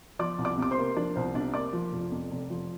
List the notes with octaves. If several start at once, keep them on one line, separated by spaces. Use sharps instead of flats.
F3 D5 D6
C2
D5 D6
C3 D6
C5 C6
A#3
F3 D4 D5
C2 C5
C3 D4 D5
A#3 D5 D6
F3
F1
F2
F1
F3